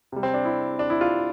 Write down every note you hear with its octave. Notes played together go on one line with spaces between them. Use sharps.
C3 G3
C4
D4
E4
D4
E4
F4